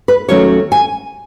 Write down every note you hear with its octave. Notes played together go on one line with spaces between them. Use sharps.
B4
D#2 D#3 F#3 A3 C#4 C#5
G#5